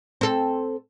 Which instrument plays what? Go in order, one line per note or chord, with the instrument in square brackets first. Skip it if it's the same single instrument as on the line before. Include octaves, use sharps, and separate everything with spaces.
[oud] C4 A4